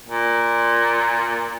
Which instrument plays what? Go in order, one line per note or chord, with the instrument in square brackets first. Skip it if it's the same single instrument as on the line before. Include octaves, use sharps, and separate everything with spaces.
[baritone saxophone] A#2